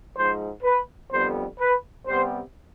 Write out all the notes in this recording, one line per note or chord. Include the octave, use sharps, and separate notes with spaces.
G#2 F3 G#3 C5
B4
F2 D3 G3 B3 C5
B4
C3 G3 B3 C5